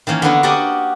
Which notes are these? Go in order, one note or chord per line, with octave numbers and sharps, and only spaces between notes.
D#3 E3 A#3 C#4
D3 A#3 B3 F#4
F#4 G4 A#4 D5 D#5 F#5